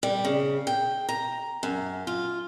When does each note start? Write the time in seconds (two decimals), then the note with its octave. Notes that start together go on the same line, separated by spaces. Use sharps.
0.03 G3
0.25 C#3
0.67 G5
1.09 A#5
1.63 F#2
2.07 F4